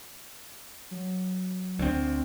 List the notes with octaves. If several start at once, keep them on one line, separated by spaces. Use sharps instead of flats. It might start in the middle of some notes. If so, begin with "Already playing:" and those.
F#3
D2 C4